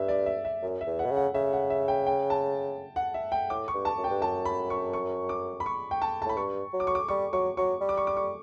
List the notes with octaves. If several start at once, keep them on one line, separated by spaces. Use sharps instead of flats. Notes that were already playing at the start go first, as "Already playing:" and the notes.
Already playing: G2 E5
D5
E5
E5
F#2
E5
E2
F#5
B2
C#3
F#5
C#3 E5
F#5
E5
G5
G5
A5
F#5
E5
G5
A2 D6
C#6
G2
A5
F#2
G5
G2
F#2 A5
B5
C#6
C#6
D6
B5
C#6
G5
A5
A5
A2 B5
G2 C#6
F#3
D6
C#6
D6
G3 C#6
F#3 C#6
F#3 C#6
G3
D6
C#6
D6
C#6